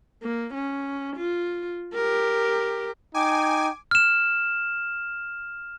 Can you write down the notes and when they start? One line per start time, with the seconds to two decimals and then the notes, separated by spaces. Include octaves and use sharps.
0.23 A#3
0.54 C#4
1.16 F4
1.94 G4 A#4
3.14 D#4 G5 G#5 D6
3.91 F6 E7